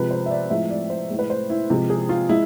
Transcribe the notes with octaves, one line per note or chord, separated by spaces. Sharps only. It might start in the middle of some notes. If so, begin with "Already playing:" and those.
Already playing: C3 F3 G#3 B4
C5
E5
D5
A2 F3 G#3 E5
D5
C5
A2 G#3
B4
C5
E4
C3 F3 G#3
G#4
F4
G#3 E4